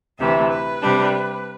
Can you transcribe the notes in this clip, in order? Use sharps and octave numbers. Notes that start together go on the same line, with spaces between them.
D2 C3 E3 E5
B4
C3 G3 D4